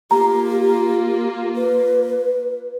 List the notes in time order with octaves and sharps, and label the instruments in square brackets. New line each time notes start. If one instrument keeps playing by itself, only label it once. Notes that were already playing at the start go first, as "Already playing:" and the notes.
[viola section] A#3 F4 [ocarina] G4 [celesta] A#5
[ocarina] B4